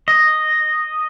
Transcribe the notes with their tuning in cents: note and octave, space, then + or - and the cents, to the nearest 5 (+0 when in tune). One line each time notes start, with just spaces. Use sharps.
D#5 -5